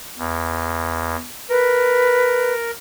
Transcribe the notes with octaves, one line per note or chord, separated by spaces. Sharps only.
E2
A#4 B4